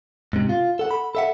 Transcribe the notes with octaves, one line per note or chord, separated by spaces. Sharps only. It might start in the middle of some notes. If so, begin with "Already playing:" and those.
G#2 C3
F4
A4 F#5
B5
A4 E5 F#5